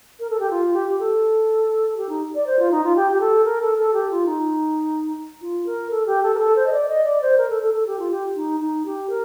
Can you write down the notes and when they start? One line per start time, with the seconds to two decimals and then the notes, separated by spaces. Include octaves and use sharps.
0.20 A#4
0.30 A4
0.39 G4
0.51 F4
0.74 G4
0.88 G4
1.00 A4
1.97 G4
2.09 D#4
2.35 D5
2.46 C5
2.59 F4
2.71 D#4
2.84 F4
2.96 G4
3.12 G4
3.21 A4
3.45 A#4
3.62 A4
3.78 A4
3.94 G4
4.11 F4
4.26 D#4
5.41 F4
5.66 A#4
5.91 A4
6.07 G4
6.23 A4
6.35 A#4
6.39 A4
6.56 C5
6.67 D#5
6.73 D5
6.88 D#5
7.04 D5
7.22 C5
7.38 A#4
7.50 A4
7.62 A4
7.74 A4
7.87 G4
7.99 F4
8.11 G4
8.36 D#4
8.60 D#4
8.86 G4
9.09 A#4